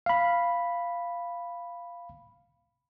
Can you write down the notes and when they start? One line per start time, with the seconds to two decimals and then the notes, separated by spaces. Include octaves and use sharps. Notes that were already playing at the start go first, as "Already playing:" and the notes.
0.06 F5 B5